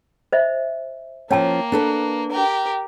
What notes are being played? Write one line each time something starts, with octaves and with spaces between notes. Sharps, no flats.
C5 D#5 E5
F3 A#3 C#4 C#5 G5 A5
D4 A4 B4
G4 A#4